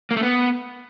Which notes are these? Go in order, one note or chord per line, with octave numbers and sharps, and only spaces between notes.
A#3
A3
B3